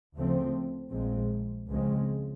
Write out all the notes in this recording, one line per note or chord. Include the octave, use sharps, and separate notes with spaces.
D2 C#3 F3 A3 C4
A#1 A#2 F3 G#3 C4
C#2 C#3 F3 G#3 C4